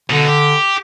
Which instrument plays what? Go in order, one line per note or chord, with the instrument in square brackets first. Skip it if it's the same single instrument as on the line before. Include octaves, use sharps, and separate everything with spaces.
[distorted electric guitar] B2 D#4 [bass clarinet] D3
[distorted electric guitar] G4